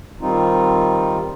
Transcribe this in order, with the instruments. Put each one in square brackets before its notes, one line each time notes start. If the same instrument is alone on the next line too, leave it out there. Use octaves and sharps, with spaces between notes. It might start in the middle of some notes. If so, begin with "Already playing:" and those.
[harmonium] D#3 G3 C4 D#4 F4